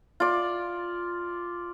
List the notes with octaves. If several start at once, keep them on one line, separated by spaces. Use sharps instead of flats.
F4 D5